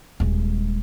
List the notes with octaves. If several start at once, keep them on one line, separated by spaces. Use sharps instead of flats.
D#1 G#3